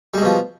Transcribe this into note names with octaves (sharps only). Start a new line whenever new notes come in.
B2 F3 G3 G#3